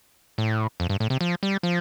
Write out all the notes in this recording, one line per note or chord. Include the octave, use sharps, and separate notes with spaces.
A2
F2
G2
A2
C3
F3
G3
F3